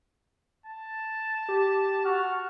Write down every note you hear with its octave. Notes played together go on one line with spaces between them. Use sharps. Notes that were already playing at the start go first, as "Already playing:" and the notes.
A5
G4
F#4 F6